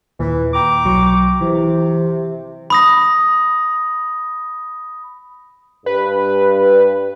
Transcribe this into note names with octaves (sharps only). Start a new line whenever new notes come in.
D#2 A#2 E3
G5 A#5 D6
B1 F#3 C#6
C3 E3
B5 D#6 A#6
G2 B4